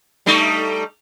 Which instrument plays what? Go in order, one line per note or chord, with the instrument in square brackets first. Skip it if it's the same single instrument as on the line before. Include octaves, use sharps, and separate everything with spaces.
[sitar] G3 A3 D#4